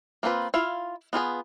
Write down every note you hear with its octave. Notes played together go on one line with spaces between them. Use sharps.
A#3 C4 F4 B4
E4 F4 F5
B3 F4 G#4 B4